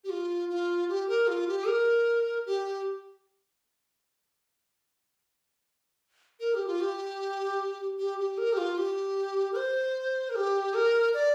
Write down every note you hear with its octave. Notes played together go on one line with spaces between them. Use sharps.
G4
F4
F4
G4
A#4
F4
G4
A#4
G4
A#4
G4
F4
G4
G4
G4
A#4
G4
F4
G4
A#4
C5
A#4
G4
A#4
D5